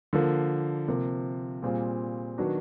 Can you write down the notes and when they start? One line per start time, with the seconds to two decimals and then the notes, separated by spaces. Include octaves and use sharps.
0.13 D3 F3 A#3
0.88 C3 F3 A#3
1.62 A#2 G3 C4 F4 G#4
2.38 D#3 F#3 B3 D4 F#4